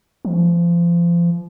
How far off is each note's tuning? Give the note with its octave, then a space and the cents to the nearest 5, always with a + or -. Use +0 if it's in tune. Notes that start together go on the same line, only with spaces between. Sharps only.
F3 -30